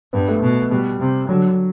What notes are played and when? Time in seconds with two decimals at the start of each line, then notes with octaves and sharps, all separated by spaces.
0.13 G2 B3
0.28 A3
0.42 B2
0.71 B2 G3
1.00 C3
1.29 D3 F#3